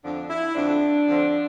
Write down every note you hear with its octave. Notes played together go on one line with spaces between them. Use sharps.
F2 D3 F3 D4
E4
F2 D3 F3 D4
F2 D3 F3